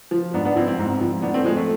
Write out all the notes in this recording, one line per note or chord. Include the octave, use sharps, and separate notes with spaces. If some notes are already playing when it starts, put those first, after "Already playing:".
F3
G#2 B3 D4
B3 D4
F3 C4 E4
C4 E4
G#2
F3
A2 B3 D4
A3 C4
F3 G#3
A3